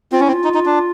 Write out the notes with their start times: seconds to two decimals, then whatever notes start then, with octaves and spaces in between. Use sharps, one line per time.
0.12 C4 F4
0.20 C#4 E4
0.27 C4
0.33 F4
0.44 D#4
0.55 D#4
0.66 D4